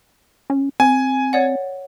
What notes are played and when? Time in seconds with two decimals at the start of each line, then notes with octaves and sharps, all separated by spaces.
0.50 C#4
0.80 C4 G#5
1.33 C#5 D5 F#5